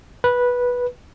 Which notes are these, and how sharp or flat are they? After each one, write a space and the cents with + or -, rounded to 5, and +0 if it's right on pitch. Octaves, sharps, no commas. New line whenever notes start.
B4 -10